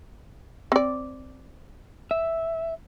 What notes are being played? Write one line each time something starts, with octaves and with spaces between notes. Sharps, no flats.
C4 D5
E5